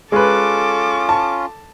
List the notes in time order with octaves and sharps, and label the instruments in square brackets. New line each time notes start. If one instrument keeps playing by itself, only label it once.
[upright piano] G#3 B4 [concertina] C#4 F4 [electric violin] A4 D6
[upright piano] A5